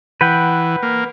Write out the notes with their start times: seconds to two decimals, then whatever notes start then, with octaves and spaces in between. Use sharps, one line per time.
0.21 E3 B4 F#5 G5
0.83 A#3